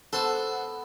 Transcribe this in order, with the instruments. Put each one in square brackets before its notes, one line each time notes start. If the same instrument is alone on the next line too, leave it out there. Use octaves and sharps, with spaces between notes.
[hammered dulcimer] B3 [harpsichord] F#4 C5 [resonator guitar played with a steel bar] A4